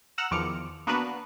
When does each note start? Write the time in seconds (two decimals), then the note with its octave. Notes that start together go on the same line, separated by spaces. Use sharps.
0.18 F#5 A#5 E6 F6
0.31 E2 D#3 F3 D6 F6 C#7
0.87 A#3 B3 D4 F#4 A#4 B4